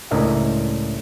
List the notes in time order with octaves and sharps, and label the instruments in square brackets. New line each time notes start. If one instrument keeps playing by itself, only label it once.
[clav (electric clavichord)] C#2 A2 D4 A#4 D#5 E5